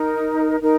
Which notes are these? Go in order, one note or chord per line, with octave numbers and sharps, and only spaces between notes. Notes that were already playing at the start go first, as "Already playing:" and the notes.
Already playing: D#4 A#4
D#4 A#4